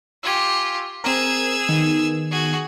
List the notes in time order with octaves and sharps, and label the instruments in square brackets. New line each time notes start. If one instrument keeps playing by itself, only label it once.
[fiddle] F4 G4 [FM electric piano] G#5 C#6 E6
[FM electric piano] C4 A#4 [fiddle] G#4 E6
[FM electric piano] D#3 B3
[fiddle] F#4 G#4